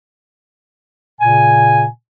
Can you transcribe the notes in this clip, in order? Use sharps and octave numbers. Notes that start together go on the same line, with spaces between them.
A#2 C#3 G#5